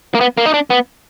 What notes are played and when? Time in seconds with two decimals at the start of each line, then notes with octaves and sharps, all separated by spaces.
0.15 A#3
0.21 B3
0.37 A#3
0.46 D#4
0.54 D4
0.70 B3